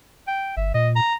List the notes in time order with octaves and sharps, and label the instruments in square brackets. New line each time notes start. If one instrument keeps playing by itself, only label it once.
[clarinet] G5
[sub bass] G1 [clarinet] E5
[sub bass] A#2 [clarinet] D#5
[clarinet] A#5